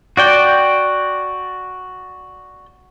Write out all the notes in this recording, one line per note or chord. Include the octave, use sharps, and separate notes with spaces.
F#4 D5 G5